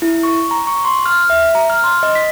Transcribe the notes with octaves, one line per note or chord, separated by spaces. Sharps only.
E4
C#6
A#5
C#6
C6
F6
E5
A#5
F6
C6
D#5
B6